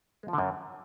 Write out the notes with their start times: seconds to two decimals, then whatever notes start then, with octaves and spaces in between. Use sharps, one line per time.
0.23 G#3
0.28 F3
0.33 D3
0.38 F#2